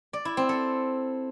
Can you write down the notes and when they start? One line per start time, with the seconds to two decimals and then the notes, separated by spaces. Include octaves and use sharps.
0.13 D5
0.25 E4
0.37 C4
0.49 A4